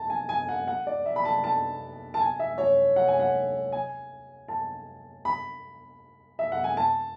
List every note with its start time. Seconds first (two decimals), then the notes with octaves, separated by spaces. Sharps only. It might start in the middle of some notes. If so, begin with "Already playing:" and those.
Already playing: A5
0.10 G#5
0.29 G#5
0.49 F#5
0.67 F#5
0.87 D5
1.06 E5
1.16 B5
1.25 A5
1.44 A5
2.14 A5
2.20 G#5
2.39 E5
2.58 C#5
2.96 F#5
3.08 G#5
3.20 F#5
3.72 G#5
4.48 A5
5.25 B5
6.39 E5
6.52 F#5
6.64 G#5
6.77 A5